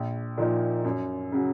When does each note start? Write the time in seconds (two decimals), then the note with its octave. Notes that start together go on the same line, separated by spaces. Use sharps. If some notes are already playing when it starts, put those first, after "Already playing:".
Already playing: A#1
0.37 A#2 F3 A#3 D#4
0.84 F#2
1.32 C#3 F#3